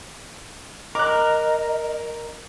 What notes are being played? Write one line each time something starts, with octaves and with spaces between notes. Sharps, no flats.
A#4 D#5 D6 F#6